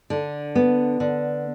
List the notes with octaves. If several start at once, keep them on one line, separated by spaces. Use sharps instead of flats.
D3
B3
D3